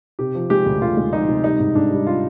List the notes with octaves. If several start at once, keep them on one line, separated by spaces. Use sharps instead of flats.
C3 G4
F3
G#3 G4
D2
D2 F4
G#3
F3 D#4
C3
G3 D#4
G#2
G#2 D4
G3
F4